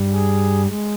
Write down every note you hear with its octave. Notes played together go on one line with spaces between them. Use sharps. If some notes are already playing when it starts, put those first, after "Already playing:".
Already playing: G2 G3
G#4
G#3